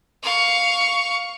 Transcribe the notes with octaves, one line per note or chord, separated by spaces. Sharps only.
F5 C#6